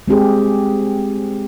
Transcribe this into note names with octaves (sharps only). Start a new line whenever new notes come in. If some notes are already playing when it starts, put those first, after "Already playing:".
G#3 C4 G4 G#4